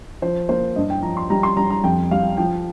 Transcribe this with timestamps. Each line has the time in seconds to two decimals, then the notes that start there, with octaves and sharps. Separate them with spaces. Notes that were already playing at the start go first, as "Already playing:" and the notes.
0.22 F3 C5
0.49 A#3 C5
0.76 G2 D#5
0.90 G5
1.02 F3 A#5
1.17 C6
1.30 G3 A#5
1.43 C6
1.57 G3 A#5
1.70 A#5
1.84 F2 G5
2.11 G3 F5
2.37 F3 G5